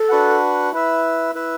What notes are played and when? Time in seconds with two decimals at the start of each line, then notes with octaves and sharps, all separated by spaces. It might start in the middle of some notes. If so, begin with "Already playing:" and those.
Already playing: A4
0.09 D4 F#4 B4 F#5
0.72 E4 B4 E5
1.34 E4 B4 E5